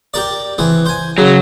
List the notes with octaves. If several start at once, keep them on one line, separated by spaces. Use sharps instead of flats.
G4 A#4 D5
E3 C4 G#4
C5 G#5
C#3 F#3